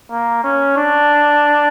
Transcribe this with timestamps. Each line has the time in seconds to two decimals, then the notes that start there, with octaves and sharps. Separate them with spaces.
0.10 A#3
0.44 C#4
0.77 D4